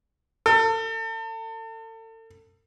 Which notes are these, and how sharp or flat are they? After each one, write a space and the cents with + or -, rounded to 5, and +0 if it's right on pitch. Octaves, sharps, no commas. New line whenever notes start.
A4 +35